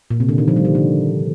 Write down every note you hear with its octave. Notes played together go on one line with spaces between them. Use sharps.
A#2
C3
D3
D#3
F3
G3
D#3
D3